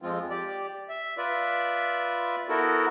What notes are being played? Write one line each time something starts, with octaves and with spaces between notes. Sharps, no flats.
F2 F3 G#3 C4 F4
G4 D5
E5
F4 B4 D5 E5
B3 E4 F#4 A4 A#4